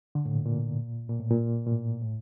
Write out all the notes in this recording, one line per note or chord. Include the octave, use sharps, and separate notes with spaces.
D3
A2
A#2
A#2
A#2
A2
A#2
A#2
A2
A2